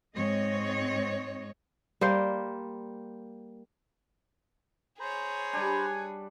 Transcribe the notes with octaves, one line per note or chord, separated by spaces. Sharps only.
G#2 C4 C#5 D#5
G3 A#3 C5
G#4 C5 C#5 A#5 B5
G3 D4 G#5